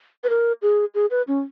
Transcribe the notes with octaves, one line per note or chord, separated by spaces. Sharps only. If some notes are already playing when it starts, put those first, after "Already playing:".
B4
A#4
G#4
G#4
B4
C#4